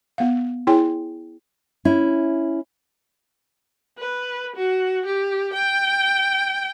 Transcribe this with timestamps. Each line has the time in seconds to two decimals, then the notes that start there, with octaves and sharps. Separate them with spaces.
0.18 B3 F5
0.67 E4 G#4 C#5 G5 G#5
1.85 C#4 E4
3.99 B4
4.56 F#4
5.06 G4
5.54 G5